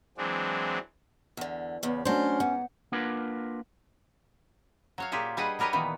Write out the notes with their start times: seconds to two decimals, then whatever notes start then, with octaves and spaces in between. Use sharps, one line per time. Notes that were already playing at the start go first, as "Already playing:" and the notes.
0.18 E3 F#3 G#3 C4 D4
1.37 E2 D3
1.83 E2 C#3 B3
2.05 F#3 A3 C#4 D4 C5
2.40 G#2 B3 F#5
2.92 A#3 D4 F4 A#4 B4 F#5
4.98 F#3 C#5 F5
5.12 A#2 A#3 F4 G4 G#4 E5
5.37 G3 D4 G#4 B4 D#5 F#5
5.59 F#3 G3 A#4 B4 C#5 D#5
5.73 A#2 D#3 E3 B3